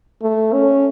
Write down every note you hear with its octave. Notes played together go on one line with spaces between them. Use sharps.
A3
C#4